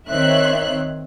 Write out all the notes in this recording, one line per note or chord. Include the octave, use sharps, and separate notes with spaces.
D#3 C4 C#5 E5 C6 F#6